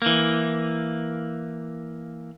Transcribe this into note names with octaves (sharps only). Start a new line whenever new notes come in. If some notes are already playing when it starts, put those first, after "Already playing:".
E3 A#3